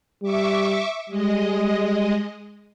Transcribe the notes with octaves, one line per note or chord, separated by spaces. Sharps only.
G3 E5 C#6 D6
G3 G#3 D#5